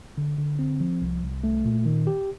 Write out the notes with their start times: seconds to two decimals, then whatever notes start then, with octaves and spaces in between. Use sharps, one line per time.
0.18 D3
0.38 D3
0.59 C4
0.80 F3
1.01 C2
1.22 C2
1.44 A3
1.65 A#2
1.86 D#3
2.07 G4